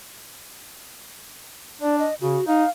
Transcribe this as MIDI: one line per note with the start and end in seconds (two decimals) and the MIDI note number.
1.81 2.06 62
1.81 1.96 74
1.99 2.14 75
2.21 2.37 49
2.21 2.45 66
2.47 2.64 63
2.47 2.70 77